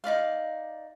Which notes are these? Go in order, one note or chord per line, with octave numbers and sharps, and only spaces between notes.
D#4 E4 D5 F5